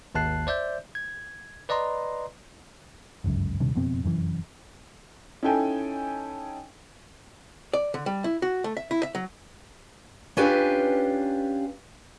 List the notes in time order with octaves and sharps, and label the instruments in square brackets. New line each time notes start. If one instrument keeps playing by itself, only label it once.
[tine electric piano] G#1 D#2 A5 F#6 C7
C5 D5 E5 G6
G#6
B4 D5 D#5 A#5 C6
[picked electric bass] G1 C#2 F#2
D#1 G2 C3 D#3
F#1 F2 B2 C4
F1 F#2 A2 E3
[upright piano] C#4 D#4 E4 A4 G5 G#5
[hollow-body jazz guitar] D5
D3
G3
E4
F#4
A3
E5
E4
E5
F#3
[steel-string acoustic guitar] C#4 D4 F4 G4 B4 G#5